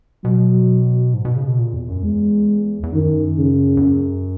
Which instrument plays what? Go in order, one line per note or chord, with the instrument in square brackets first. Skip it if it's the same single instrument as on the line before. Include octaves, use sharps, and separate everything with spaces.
[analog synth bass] B2 [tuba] F#3
[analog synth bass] G#2
B2
C#3
B2
A#2
E2
F#2
[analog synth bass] E2 [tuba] G#3
[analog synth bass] E2
[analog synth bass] F#2 [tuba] D#3
[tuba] C#3
[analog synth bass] E2
F#2